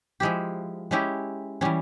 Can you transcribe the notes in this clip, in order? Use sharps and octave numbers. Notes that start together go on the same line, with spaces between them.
F3 G#3 E4 G4
G#3 C#4 E4 G4
E3 G3 C#4